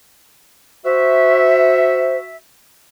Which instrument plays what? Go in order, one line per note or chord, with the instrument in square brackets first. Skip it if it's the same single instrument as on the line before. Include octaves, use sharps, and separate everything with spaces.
[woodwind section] F#4 E5 [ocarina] C5